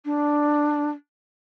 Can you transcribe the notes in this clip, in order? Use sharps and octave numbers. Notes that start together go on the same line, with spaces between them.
D4